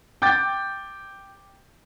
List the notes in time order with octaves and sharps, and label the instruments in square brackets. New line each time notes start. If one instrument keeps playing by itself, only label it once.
[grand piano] G5 D6 G6 A6